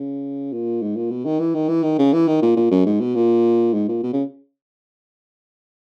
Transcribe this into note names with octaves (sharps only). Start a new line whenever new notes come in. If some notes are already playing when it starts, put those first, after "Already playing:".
Already playing: C#3
A#2
G#2
A#2
B2
D#3
E3
D#3
E3
D#3
C#3
E3
D#3
A#2
A#2
F#2
G#2
B2
A#2
G#2
A#2
B2
C#3